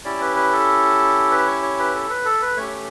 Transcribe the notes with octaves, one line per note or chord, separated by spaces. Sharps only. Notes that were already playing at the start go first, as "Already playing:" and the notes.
C#4 E4 G4 D5
B4
B4
A4
B4
C#5
C#5
B4
A4
B4
A4
B4
A3 C#4 G4 C#5